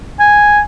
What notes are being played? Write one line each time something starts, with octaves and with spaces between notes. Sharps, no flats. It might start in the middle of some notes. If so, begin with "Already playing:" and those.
G#5